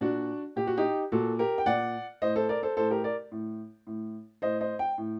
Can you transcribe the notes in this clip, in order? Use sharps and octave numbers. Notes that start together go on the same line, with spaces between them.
A#2 D4 F#4
A#2 G4
F#4
D#4 G4
A#2 F#4 A4
G4 A#4
G5
A#2 D5 F#5
A2 C5 D#5
A4 C5
A#4 D5
A4 C5
A2 A4 C5
G4 A#4
A#4 D5
A2
A2
A2 C5 D#5
C5 D#5
G5
A2